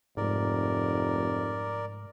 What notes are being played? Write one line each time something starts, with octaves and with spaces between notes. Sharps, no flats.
F1 G#2 A#4 D5